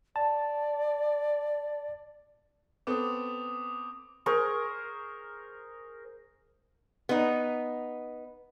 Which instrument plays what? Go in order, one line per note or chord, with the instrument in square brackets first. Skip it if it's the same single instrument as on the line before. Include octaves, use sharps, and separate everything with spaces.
[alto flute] D5 [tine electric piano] A5
[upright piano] B3 C4 A4 [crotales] D6 D#6
[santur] G#4 A#4 C5 C#6
[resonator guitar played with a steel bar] B3 D#4